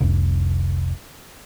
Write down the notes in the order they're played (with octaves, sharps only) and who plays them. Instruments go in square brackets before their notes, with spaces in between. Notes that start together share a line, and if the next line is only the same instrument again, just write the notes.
[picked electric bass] F1 C2